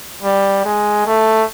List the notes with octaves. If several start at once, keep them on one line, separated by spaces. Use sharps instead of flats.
G3
G#3
A3